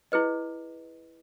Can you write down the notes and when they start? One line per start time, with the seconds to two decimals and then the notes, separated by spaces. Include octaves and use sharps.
0.12 E4 G#4 B4 D#5